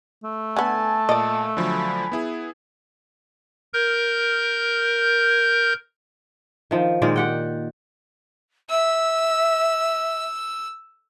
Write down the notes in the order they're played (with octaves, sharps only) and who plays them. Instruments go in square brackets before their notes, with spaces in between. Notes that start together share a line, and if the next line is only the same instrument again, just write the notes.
[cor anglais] A3
[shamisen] D3 B3 [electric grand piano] G#5 [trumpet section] A5
[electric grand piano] A#2 [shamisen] D5 D#5
[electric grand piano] D3 F3 F#3 [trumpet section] G#5 B5
[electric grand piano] B3 E4 G#4
[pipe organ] A#4 G6
[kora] D#3 F3
A#2 D#3 G#3 D5
G4 F#5 G5
[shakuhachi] E5 [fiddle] E6